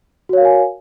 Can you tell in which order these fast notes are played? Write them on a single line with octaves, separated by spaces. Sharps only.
F#4 C#5 F5 A#4 G#5